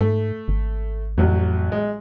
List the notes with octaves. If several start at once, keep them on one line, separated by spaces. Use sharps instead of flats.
G#2 A3
G#1
A1 F2 F#3
G#3